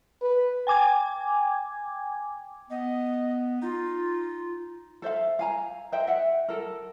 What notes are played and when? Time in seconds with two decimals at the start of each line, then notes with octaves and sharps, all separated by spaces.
0.21 B4
0.67 G5 G#5 D6 G#6
2.70 B3 D#5
3.62 D#4 F4
5.02 A4 C5 E5 F5
5.39 F5 G#5 A#5
5.92 C5 D#5 E5 G5
6.07 E5 F#5
6.49 A4 A#4